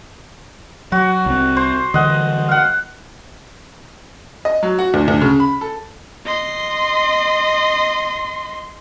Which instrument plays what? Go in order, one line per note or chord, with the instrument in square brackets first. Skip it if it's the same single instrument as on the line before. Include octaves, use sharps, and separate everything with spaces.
[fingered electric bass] F#3 [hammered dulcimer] F#4
[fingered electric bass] C2 C4
[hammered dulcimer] C5
[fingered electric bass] D3 E3 G3 [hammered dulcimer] D#5 F#5
[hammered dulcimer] F5 F#5
[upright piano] D#5
F#3
F#4
D2
D2
C#3
B5
A4
[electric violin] D#5 C6